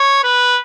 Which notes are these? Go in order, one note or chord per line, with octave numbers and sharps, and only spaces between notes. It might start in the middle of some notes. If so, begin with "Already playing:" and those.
Already playing: C#5
B4